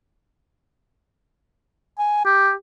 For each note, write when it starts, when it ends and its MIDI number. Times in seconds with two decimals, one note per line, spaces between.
1.99 2.25 80
2.25 2.52 67